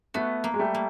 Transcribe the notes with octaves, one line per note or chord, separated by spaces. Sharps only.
A3 B3 F#4
A#3
G#3
G3 A3
A#3